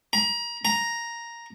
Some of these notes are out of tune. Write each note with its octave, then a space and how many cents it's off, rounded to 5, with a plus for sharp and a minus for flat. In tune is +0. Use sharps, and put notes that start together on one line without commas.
A#5 +30
A#5 +5